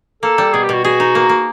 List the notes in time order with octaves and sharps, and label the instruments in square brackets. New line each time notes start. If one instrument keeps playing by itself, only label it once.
[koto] A#3 [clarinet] A4
[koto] G3
[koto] B2 [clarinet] G#4
[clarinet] G4
[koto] B2 [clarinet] F#4
[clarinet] F#4 [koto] G#4
[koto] D#4
A#3
A#3